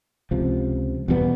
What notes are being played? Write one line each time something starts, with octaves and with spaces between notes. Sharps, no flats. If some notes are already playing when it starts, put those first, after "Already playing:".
C#2 C3 F3
E2 B2 G3 B3